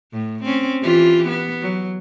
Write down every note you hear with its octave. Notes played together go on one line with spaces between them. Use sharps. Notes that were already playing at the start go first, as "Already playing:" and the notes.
A2
C4 C#4
E3 F4 G4
B3
F#3